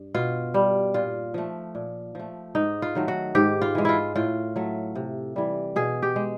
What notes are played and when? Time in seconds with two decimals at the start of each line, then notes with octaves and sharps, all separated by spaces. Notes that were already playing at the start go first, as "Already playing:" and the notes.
Already playing: G2
0.15 B2 F4
0.54 G3
0.94 A#2 F4
1.34 F3 A3
1.75 A#2
2.15 F3 A3
2.55 G#2 D#4
2.82 F4
2.95 D#3 F#3 A3
3.08 F#4
3.35 G#2 G4
3.62 F4
3.75 E3 G#3
3.85 E4 F4
4.15 A2 F4
4.56 F#3 A3
4.95 C3
5.36 E3 G3
5.76 B2 G#4
6.02 G4
6.16 G#3